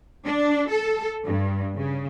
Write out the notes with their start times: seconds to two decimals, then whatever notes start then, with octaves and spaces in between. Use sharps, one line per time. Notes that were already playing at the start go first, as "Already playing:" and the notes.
0.25 D4
0.70 A4
1.24 G2
1.76 C#3